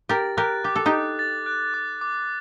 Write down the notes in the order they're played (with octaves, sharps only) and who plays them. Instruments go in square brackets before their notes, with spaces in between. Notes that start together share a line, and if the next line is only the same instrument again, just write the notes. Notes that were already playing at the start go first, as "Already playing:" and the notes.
[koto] G4 A#4 [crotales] A6
[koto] G4 A#4 [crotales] F#6
[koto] G4 [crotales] D6
[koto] A4
D#4 G4
[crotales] D6
A6
F#6
D6
D6